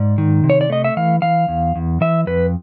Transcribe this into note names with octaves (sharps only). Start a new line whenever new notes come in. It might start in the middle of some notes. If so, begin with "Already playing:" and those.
Already playing: G#2 D5
D#3
C3
C#5
D5
A3 D#5
E5
E3 F5
E3 F5
E2
E2
E3 E5
F2 B4